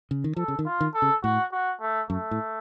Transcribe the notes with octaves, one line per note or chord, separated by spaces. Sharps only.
C#3
D#3
F3 A4
C#3
D#3
F4
D#3
A4
C#3
A2 F#4
F#4
A3
F#2 A3
A2